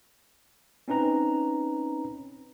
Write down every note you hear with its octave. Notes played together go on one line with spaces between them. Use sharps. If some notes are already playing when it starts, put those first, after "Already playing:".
C4 C#4 D#4 B4 A#5